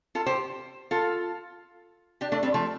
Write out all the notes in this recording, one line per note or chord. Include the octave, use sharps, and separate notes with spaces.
F4 A4
G4 C5
F4 A4
D4 G4
A3 D4
G3 C4
F3 A3